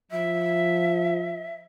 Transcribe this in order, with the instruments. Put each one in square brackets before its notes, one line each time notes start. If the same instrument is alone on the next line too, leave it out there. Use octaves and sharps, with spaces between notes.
[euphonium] F3 [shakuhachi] E5